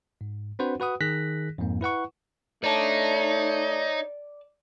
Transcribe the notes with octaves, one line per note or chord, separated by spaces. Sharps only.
G#2
C4 D4 F#4 B4 C5 F#5
F#4 B4 F#5 D#6
D#3 G#4 F#6 A#6 B6
F2 G#2 A#3
E4 B4 F#5 C#6
A3 D#4 C#5 D5 A5